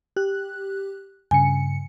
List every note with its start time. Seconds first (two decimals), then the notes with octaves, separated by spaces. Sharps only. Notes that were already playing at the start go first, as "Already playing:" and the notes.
0.16 G4 F#6
1.31 G2 C#3 G#5 C#7